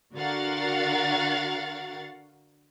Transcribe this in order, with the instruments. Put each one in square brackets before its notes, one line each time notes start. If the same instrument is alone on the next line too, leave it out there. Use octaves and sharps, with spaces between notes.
[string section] D3 F#4 A#4 F5 F#5 A6